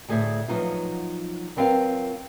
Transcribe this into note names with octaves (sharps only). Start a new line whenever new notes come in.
D2 A2 G#4 C5 E5
F3 F#3 B3 D#4 F4
F#3 B3 C4 F4 A#4 F5